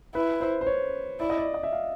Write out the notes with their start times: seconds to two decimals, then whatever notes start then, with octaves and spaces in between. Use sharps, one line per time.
0.15 E4 B4
0.41 C5
0.61 C5
0.67 C#5
1.20 E4 D5
1.30 D#5
1.38 D5
1.54 D#5
1.63 E5
1.73 F5